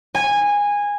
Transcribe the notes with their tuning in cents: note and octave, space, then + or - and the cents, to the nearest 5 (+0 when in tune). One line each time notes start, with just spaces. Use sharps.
G#5 -15